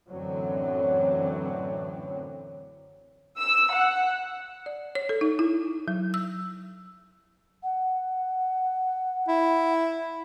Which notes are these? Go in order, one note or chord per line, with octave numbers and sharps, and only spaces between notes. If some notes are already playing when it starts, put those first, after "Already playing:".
F#2 A2 D3 E3 F#3 C4
E6
F#5
D5
C#5
A4
D#4
E4
F#3
E6
F#5
E4